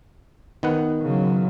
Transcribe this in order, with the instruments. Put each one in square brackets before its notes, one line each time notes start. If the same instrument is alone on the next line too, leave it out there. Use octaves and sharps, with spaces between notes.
[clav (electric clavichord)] D#3 B3 F#5
[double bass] C#3 F#3